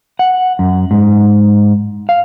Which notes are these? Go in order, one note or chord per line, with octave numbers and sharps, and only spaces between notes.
F#5
F#2
G#2
F5